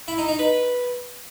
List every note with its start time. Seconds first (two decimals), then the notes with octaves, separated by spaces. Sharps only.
0.08 E4
0.18 D#4
0.28 D#4
0.39 B4